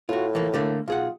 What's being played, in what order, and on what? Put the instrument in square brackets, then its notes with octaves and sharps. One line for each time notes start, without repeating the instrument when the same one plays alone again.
[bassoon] A2 [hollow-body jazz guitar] F4 F#4
[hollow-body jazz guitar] E3 F3 A#3
D3 A3 A#3
[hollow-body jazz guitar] B1 G#4 F#5 [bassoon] F4